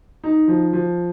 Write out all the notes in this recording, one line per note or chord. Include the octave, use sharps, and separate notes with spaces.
D#4
F3
F3